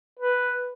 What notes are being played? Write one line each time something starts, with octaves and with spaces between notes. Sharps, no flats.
B4